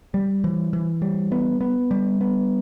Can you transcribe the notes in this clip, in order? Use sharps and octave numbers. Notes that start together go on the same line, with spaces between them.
G3
E3
E3
G3
B3
B3
G3
B3